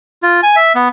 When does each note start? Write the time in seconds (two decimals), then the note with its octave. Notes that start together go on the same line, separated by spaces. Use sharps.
0.23 F4
0.43 G#5
0.56 E5
0.75 B3